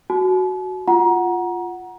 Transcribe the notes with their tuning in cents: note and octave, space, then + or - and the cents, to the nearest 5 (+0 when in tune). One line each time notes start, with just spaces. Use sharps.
F#4 +5 A5 -45
F4 +0 F#5 +0 A#5 +25